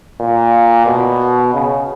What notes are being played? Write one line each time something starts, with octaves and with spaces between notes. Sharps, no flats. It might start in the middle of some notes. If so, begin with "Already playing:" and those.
A#2
B2
C#3